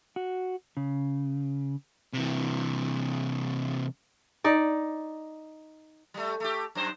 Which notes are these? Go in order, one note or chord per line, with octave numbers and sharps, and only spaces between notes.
F#4
C#3
C3 E3
D#4 D5
G3 A3
A3 G4
F#2 C5